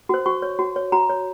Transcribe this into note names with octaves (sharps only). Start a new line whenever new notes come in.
F#4 C5
F#4 C#6
C#5
F#4
C#5
F#4 A#5
C#5